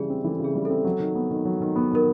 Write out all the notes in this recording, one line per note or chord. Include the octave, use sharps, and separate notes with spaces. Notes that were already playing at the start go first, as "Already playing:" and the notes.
Already playing: C#3 E3 G3 G#4
C4
E3 A4
C#3 G#4
G3
C4 A4
F#3
D#3
B3
D#3
F#3
D#3
B3
D#3 A#4